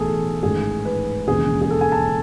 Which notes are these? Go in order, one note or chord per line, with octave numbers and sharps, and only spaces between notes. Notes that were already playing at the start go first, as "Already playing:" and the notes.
Already playing: B1 A2 E3 G#4 A4
A1 G#2 D#3 G#4
B4
E1 D#2 C#3 E3 G#4
G#4
A4
G#5
A5